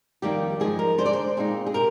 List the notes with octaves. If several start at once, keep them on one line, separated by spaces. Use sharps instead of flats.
F2 D#3 G3 A#3 D#4 G4
G#2 F3 G#3 G#4
A#4
D3 G#3 D4 C5
D5
C5
A#2 G#3 C4 D#4
G#4
C3 A#4